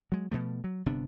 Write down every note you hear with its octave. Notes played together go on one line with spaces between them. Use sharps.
F#3 G#3
B2 F3 A3
F#3
G1 C3 B3 D4